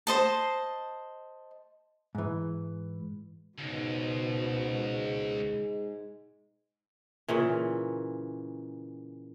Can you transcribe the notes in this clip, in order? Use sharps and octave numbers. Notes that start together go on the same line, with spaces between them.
C5 D#5 A5
G#2 E3
C#2 G#2 B2
G#3
A#2 C#3 E3